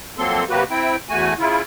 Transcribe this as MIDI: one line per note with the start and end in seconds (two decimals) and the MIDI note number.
0.18 0.45 41
0.18 0.45 54
0.18 0.45 58
0.18 0.45 60
0.18 0.45 69
0.18 0.45 84
0.49 0.64 48
0.49 0.64 54
0.49 0.64 58
0.49 0.64 66
0.49 0.64 67
0.49 0.64 71
0.70 0.96 60
0.70 0.96 64
0.70 0.96 79
1.09 1.34 40
1.09 1.34 57
1.09 1.34 66
1.09 1.34 80
1.39 1.62 49
1.39 1.62 64
1.39 1.62 65